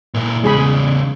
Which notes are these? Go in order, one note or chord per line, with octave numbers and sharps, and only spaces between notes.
A#2 E4
E2 C#3 G#3 G#4 B5